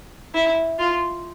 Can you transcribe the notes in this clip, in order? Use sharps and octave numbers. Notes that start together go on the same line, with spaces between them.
E4
F4